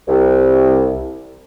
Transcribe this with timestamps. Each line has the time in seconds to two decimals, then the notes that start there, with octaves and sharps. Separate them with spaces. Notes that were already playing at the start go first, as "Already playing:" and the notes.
0.08 C2